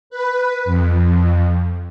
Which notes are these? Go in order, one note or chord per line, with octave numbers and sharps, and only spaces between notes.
B4
F2